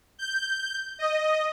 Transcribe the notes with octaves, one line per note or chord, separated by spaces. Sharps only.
G6
D#5